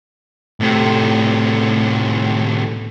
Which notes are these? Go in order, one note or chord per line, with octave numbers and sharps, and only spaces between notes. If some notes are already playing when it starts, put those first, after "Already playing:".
A2 C3